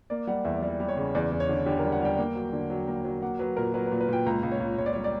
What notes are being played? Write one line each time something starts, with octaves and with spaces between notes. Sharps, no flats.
A#3 D5
G3 F#5
E2 E5
G3 D5
G3
C#5
C#3
E2 D5
E2
C#5
D3
D3 G4
G3 A#4
F#5
G3 G5
A#3
F#3
D3
F#3
A#3
F#3
A#3 F#5
F#3 B4
A#2 A#4
F#3 B4
B4
A#2
B4
A#2 G5
C#2 A#5
C#2
C#5
C#2
C#2 C#5
D5
G3 C#5
D5